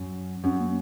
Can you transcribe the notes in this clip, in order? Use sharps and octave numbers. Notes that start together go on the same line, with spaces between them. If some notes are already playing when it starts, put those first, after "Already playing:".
Already playing: F#2
F#2 C#4
A#3